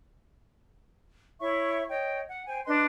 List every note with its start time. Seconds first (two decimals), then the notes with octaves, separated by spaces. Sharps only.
1.40 E4 C#5 E5 C#6
1.89 C#5 D#5 G5
2.29 F#5
2.47 C5 G5 G#5
2.66 D4 B4 D#5 C6